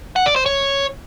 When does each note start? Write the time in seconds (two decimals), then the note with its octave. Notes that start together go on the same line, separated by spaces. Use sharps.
0.16 F#5
0.26 D5
0.36 C5
0.46 C#5